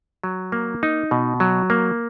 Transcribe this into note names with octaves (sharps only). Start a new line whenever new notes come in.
F#3
A#3
D#4
B2
F#3
A#3